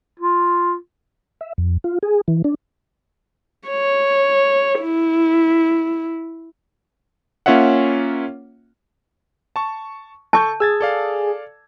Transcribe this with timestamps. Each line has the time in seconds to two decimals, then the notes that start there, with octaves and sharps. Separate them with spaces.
0.19 F4
1.41 E5
1.58 F2
1.84 F4
2.03 G#4
2.28 E3
2.44 D4
3.69 C#5
4.82 E4
7.46 A#3 C#4 F4 C#5 E5 F#5
9.56 A5 C#6
10.33 A4 A5 C#6 G6
10.60 G#4 E6 G#6 A6
10.81 A4 D5 F5